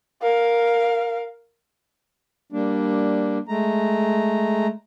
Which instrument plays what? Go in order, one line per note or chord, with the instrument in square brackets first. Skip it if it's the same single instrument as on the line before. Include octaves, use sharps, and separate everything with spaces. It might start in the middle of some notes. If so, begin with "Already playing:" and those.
[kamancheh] A#4 F5
[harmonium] G3 A#3 D4
G#3 A3 A#5